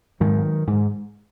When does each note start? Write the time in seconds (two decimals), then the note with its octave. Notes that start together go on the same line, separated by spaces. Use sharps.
0.20 G#2 D#3 F#3
0.67 G#2